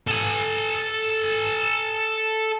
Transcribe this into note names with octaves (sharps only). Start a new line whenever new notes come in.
A4 G#5